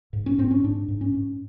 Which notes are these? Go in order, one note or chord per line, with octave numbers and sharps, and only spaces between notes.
G#2
C#4
G#2 C4
C#4
G#2 D4
G#2
C#4
G#2